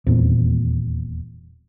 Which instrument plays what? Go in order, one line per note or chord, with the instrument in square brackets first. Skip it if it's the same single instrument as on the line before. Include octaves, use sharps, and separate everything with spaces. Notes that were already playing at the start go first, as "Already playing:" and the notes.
[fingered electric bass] D#1 E2 A#2 C4